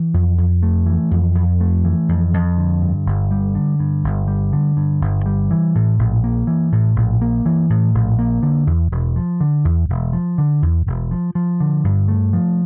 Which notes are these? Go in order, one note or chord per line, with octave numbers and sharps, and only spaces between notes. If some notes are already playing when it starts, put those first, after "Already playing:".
Already playing: E3
F2
F2
A3
E3
F2
F2
A3
E3
F2
F2
D3
G2
G1
G3
D3
G2
G1
G3
D3
G2
G1
G3
E3
A2
A#1
A#3
E3
A2
A#1
A#3
E3
A2
A#1
A#3
D3
E2
E1
F3
D3
E2
E1
F3
D3
E2
E1
F3
F3
D3
G2
A3
F3